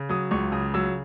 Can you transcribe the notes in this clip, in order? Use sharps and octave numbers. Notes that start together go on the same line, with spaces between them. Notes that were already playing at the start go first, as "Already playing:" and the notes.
Already playing: C#3
F#3 D#6
C#2 C#6
C#3 D#6
F#3 E6